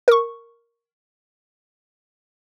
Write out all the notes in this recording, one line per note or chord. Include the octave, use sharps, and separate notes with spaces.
A#4 C#6